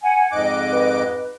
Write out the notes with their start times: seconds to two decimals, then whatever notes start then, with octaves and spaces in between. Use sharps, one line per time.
0.03 F#5 G#5
0.32 F2 G#2 D#5 D6 F#6
0.73 B4